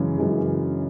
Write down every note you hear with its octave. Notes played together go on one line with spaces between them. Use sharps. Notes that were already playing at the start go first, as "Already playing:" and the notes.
Already playing: F#2 C#3 E3 G#3
F#2 C#3 E3 G#3